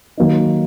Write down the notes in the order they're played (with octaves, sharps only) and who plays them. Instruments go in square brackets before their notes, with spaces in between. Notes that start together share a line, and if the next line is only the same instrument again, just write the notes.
[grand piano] D#3 F#3 A#3 D#4